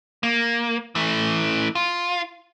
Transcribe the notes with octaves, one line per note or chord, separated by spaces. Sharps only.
A#3
E3 A3
F4